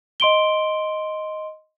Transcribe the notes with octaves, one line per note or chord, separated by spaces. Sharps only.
D#5 C6 D7 G7